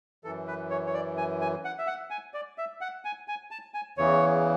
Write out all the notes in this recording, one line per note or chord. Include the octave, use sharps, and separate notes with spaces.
F#2 E3 A4
B4
C#5
C#5
D5
G#5
G#5
F#5
E5
F#5
G#5
D5
E5
F#5
G#5
G#5
A5
G#5
E2 C#3 E3 C#5